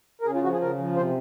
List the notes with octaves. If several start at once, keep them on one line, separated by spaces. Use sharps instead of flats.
A#4
C#3 G#4
F4
F3 F#4
G#4
C#3 A#4
F3
C3 C5